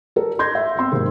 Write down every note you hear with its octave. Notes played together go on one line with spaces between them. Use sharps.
A4 A#4
C6 G6 G#6 A#6
E5
B3 C4 C6 E6
G#2 C3 A#3